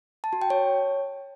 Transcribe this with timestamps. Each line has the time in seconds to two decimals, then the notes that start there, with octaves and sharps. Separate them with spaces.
0.24 A5
0.33 F#4
0.42 G5
0.50 C#5